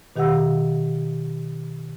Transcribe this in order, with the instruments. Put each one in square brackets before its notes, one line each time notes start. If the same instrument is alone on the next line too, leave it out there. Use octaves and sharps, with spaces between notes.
[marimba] B2 D#3 G4 F5 F#5 E6